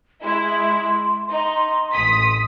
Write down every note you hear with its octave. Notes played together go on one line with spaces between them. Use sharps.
G#3 E4 C6
D#4
A1 D#6 B6